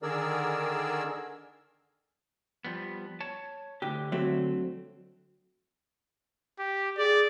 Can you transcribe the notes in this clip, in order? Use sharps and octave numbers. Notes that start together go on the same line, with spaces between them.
D3 D#3 G#4 A#4 D5 E6
F3 G3 B3
C#5 A5
D2 D3 G4
F#3 A3 C4
G4
G#4 D5